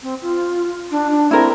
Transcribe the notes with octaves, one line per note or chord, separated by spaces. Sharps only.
C4
F4
D4
D4
C4 E4 A#4